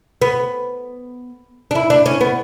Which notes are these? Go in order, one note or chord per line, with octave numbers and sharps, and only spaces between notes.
B3
D4
E4
D4
C#4
B3